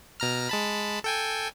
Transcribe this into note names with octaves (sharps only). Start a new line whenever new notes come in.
B2 A#5 F6
G#3 A5 B5
A4 G5 G#5